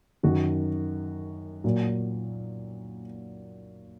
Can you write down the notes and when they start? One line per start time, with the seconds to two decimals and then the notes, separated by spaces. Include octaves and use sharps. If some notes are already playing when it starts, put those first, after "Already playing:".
0.23 F#2 D#3 F#3 F#4
1.64 A#2 F#3